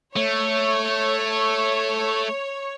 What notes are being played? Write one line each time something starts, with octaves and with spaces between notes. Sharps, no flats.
A3 C#5